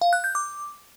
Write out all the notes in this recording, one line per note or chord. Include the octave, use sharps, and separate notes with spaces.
F5
F#6
G6
D6